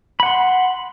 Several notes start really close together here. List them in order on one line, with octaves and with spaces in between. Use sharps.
B5 F#5 C6